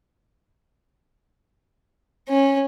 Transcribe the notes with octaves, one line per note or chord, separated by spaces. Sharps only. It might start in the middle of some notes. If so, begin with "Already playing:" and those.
C#4